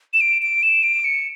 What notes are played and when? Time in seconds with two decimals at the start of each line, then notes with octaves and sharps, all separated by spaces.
0.14 E7
0.21 D7
0.42 D7
0.63 E7
0.83 D7
1.04 C#7